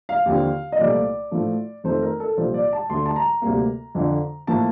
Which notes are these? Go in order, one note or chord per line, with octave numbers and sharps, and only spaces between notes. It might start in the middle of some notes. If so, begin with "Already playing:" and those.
F5
D#2 D3 F3 C4
D#5
C2 A#2 F3 A3 D5
A2 F3 A3
F2 D#3 A3 C4 C5
A#4
A4
C2 A#2 F3 C5
D5
A5
D2 D3 A3 C6
A5
A#5
D2 C3 G3 A#3
F2 D3 F3
A2 F3 A#3 A5